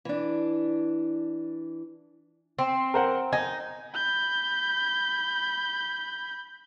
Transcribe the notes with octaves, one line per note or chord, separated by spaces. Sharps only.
E3 D4
C4
A#4 C5 F#5
D#4 G#5
B5 G6